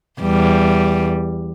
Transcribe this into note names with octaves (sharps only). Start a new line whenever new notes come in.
E2 G3